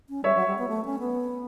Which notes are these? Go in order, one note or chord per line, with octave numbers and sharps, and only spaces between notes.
C#4
G3 C#5 E5
F#3
G3
B3
A3
C#4
B3